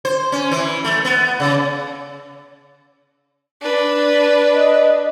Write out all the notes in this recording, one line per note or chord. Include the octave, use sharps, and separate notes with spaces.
C5
C#4
E3
A3
B3
C#3
D4 B4
D#5